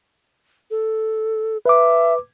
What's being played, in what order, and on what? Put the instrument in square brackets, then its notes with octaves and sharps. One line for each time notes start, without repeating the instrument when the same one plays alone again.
[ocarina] A4
[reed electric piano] B4 D6 [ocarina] E5